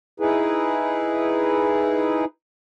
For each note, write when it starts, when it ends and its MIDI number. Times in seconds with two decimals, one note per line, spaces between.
0.20 2.25 63
0.20 2.25 64
0.20 2.25 68
0.20 2.25 71